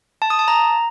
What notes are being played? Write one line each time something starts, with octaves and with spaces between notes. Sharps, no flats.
A5
D#6
A5
A#5